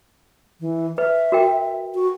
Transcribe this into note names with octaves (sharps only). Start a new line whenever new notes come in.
E3
B4 E5
F#4 A#4 G5
F#4